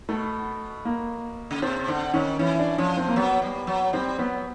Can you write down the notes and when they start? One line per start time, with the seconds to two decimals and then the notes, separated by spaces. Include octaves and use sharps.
0.09 B2 A3
0.85 A#3
1.51 C#3
1.62 C3 C4
1.88 D3 C4
2.13 D#3 C#4
2.39 E3 C#4
2.59 D4
2.78 F3 C#4
2.97 C4
3.08 A#3
3.16 F#3 B3
3.42 G3
3.67 F#3
3.93 G3 C4
4.19 F#3 B3